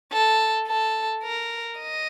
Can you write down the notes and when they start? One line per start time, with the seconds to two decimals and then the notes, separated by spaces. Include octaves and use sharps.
0.13 A4
0.68 A4
1.24 A#4
1.79 D#5